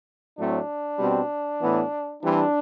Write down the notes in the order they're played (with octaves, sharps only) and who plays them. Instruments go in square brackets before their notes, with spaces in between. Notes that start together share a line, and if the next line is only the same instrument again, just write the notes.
[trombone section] A2 F#3 A3 C4 D4
B2 G3 C4
A2 E3 B3
E3 G3 C4 D4